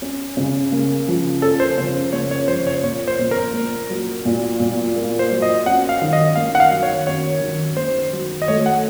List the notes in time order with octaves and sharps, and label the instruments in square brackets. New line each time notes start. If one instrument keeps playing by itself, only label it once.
[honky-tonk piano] C#4
C#3
A#3
F3
[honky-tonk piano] C#4 [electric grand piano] A4
[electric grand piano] C5
[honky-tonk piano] C#3 [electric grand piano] C5
[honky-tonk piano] A#3 [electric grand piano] C#5
[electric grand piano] C#5
[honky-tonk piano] F3 [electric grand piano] C5
[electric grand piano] C#5
[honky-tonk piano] A#2 [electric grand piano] C#5
[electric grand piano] C5
[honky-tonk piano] A#2
[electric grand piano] A#4
[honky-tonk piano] A#3
F#3
A#2
A#2
A#3
[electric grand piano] C5
[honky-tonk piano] F#3
[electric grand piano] D#5
[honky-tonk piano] C#4 [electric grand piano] F#5
[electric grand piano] F5
[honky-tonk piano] D#3
[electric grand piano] D#5
[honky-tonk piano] A#3 [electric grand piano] F5
[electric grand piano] F#5
F5
[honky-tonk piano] F#3
[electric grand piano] C#5
[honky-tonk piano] C#4 [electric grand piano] C#5
[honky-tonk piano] D#3
[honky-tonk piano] A#3 [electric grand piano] C5
[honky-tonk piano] F#3
[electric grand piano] D#5
[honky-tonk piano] A3 [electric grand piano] C#5
[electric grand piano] F#5